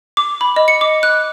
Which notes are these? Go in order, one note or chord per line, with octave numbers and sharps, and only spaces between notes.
D6
B5
D#5
C#7
D6
F#6